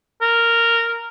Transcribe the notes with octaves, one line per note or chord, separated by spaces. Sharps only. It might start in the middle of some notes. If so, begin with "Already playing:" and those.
A#4